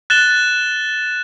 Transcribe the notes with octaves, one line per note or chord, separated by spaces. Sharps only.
F#6 A6 E7 G7